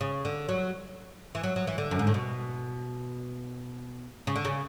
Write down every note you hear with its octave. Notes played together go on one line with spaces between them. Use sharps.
C#3
D3
F#3
E3
F#3
F#3
E3
D3
F#2
G#2
A2
B2
C#3
D3
C#3